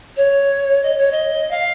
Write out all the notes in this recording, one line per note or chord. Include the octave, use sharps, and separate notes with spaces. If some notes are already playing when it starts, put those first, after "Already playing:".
C#5
D#5
C#5
D#5
F5